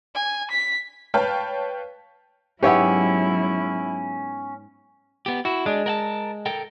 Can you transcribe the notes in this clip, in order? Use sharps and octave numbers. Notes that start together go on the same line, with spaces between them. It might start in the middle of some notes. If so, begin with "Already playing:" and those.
G#5
B6
B4 C#5 F5 G5 A5 F6
G#2 F#3 B3 C#4 E4 G4 C#5 E5
B3 G4
E4 F#4
G#3 D4
A#4 F#5 A5
A4 A#4 G5